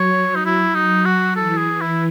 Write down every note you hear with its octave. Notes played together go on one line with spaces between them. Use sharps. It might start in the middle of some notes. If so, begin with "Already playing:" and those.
Already playing: F#3 C#5
D#4
E4
D#4
F#4
E3 A4
G#4
E4